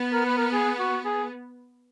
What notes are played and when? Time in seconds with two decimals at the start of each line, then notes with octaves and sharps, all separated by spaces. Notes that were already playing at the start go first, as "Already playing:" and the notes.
Already playing: B3
0.13 A#4
0.25 B4
0.37 A#4
0.53 G#4
0.79 F#4
1.05 G#4